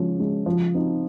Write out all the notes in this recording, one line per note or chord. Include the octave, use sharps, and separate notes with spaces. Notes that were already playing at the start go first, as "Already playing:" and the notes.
Already playing: F3 G#3 C#4
G#3 C#4
F3
C4 D#4